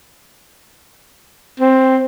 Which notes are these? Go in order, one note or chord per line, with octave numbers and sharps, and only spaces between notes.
C4